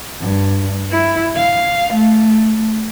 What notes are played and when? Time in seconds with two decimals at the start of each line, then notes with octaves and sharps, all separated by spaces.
0.21 G2
0.91 E4
1.36 F5
1.94 A3